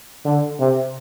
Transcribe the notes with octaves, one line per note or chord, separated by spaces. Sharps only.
D3
C3